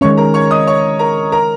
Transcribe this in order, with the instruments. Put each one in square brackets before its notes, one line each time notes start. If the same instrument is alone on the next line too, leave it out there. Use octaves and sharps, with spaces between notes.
[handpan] D#3 G#3 C#4 [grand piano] C#5 C#6
[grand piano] A#4 A#5
C#5 C#6
D#5 D#6
C#5 C#6
A#4 A#5
A#4 A#5